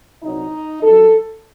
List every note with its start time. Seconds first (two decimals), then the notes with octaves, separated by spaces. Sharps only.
0.23 C2 A#2 F#3 D#4
0.82 F#2 D#3 F#3 A4